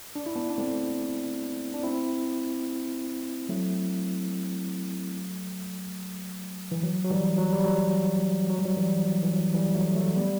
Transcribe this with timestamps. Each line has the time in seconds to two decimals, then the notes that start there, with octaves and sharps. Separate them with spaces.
0.15 D4
0.26 E4
0.36 B3 D4
0.50 D4
0.58 A3 C4
1.74 D4
1.83 C4 E4
3.49 F#3 A3
6.72 E3
6.83 F#3
7.04 F#3
7.10 E3 G3
7.38 F#3
7.53 G3
7.65 F#3
8.50 F#3
8.58 G3
8.65 F#3
8.77 E3 G3
9.06 F#3
9.23 E3
9.33 F#3
9.54 E3 G3
9.74 F#3 A3
9.95 F#3 A3
10.16 G3 B3